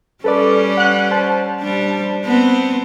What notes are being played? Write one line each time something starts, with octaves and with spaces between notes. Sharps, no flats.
G3 C#4 A4 B4 D5
F#5 F#6
C5 A5
G3 D4
B3 C4